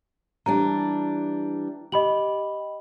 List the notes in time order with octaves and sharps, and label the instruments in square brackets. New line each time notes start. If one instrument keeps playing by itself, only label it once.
[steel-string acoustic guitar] E3 G3 D4 [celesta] A#5
[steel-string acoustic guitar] G4 [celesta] D#5 B5 F#7